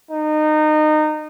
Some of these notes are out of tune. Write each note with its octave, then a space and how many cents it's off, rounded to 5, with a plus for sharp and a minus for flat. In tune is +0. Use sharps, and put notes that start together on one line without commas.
D#4 -25